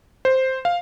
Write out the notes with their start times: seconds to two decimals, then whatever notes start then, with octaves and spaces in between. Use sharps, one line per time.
0.25 C5
0.65 F5